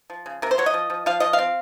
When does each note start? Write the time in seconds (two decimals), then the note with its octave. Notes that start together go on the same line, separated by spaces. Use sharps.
0.10 F3
0.26 C#3
0.42 C3 A#4
0.51 C5
0.58 F#3 C#5
0.66 D#5
0.74 F3
0.90 F3
1.06 F3 F5
1.20 F3 D#5
1.33 F5
1.38 C4